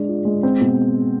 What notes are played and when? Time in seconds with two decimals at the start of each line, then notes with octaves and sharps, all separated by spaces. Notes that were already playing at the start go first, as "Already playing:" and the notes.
Already playing: G#3 D4
0.08 F4
0.25 G#3
0.43 C4
0.61 B2